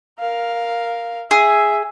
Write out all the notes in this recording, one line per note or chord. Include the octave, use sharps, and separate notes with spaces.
A#4 F5
G#4 E5